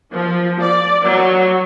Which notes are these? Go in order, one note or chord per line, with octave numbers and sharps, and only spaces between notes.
F3
D5
F#3